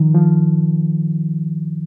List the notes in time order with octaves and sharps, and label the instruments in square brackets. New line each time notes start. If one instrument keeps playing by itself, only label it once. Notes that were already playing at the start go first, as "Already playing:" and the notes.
Already playing: [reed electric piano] D#3 F3
F3